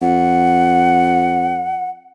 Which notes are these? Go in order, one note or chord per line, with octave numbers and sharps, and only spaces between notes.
F2 F#5